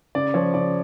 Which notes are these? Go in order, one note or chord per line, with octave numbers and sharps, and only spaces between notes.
C#3 D5
F3 C#5
C#3 D5